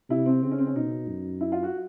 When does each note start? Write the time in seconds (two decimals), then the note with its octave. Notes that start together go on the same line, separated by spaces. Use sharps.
0.10 C3 E4
0.26 C4
0.43 C#3 C4
0.51 C#4
0.59 C4
0.67 C#4
0.76 B2 D#4
1.09 F#2
1.41 E4
1.52 F4
1.63 F#4